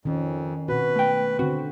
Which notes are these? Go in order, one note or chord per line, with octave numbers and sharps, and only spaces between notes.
F2 D#3 C#4
B2 C4 F#4 B4
A3 G5
D3 C4 F#4